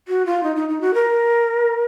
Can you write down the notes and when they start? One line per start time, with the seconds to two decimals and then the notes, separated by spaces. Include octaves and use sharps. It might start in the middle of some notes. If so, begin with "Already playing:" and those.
0.08 F#4
0.26 F4
0.43 D#4
0.56 D#4
0.69 D#4
0.81 F#4
0.94 A#4